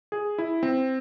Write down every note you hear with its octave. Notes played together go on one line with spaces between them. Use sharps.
G#4
E4
C4